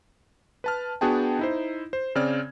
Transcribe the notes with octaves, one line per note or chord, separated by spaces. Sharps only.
B4 A5 F6
B3 D4 F#4 G#4 G5 A5
D#4 E4 C5
C5
C#3 C4 D5 F6 G#6